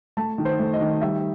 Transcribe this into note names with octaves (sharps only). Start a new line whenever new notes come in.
A3 A5
D#3
C5
A3
D#5
D#3
G3 E5